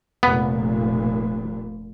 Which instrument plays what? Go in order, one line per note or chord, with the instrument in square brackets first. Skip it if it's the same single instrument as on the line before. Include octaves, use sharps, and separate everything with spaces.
[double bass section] F1 A#2 [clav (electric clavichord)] B3